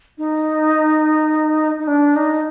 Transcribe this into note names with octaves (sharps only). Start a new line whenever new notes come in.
D#4
D#4
D4
D#4